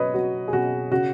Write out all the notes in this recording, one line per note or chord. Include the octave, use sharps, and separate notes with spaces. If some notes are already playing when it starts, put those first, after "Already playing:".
Already playing: B2 F#3 B4 C#5 D#5
F#3 F#4
G#4
B2 F#4
C#3 F#4